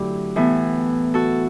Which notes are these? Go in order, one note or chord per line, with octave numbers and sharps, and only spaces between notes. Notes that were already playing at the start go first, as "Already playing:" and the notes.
Already playing: D3 F#3 A3 E4 G4
A2 E3 B3
F#4 A4